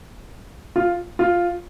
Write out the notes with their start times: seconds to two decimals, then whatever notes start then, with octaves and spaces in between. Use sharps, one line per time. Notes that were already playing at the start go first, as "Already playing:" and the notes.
0.76 F4
1.19 F4